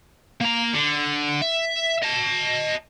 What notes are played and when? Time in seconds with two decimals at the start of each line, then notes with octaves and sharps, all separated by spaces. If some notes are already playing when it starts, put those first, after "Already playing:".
0.41 A#3 A#5
0.74 D3
1.41 E5
2.03 D#5 A5